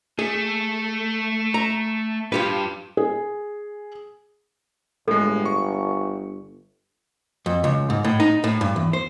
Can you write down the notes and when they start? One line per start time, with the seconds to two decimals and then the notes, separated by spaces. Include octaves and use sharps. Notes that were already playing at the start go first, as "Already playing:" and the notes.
0.19 A3 G#4
1.54 A#5
2.32 G2 F4 G4 B4
2.97 G#4
5.08 G1 A2 G#3 A4
5.45 C#6
7.46 F2
7.64 C#2
7.90 G#2
8.04 A2
8.20 D#4
8.44 A2
8.61 G2
8.76 E2
8.93 C5